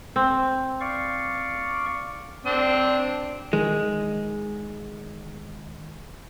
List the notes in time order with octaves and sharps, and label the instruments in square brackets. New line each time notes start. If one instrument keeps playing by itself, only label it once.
[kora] C4
[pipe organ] D5 F5 C#6
[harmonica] C4 D4
[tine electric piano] D#3 [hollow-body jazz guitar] G#3